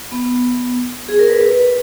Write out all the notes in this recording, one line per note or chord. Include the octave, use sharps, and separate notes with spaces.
B3
G#4
A#4
B4
B4